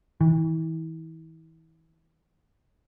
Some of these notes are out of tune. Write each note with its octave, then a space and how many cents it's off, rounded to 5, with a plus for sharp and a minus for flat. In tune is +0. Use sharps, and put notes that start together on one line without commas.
E3 -35